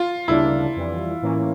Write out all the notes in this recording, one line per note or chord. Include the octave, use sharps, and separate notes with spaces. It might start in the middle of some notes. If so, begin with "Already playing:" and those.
Already playing: F4
D2 C#3 G3 A#3 D4 E4
F2 E3 G3
A2 E3 A#3 C#4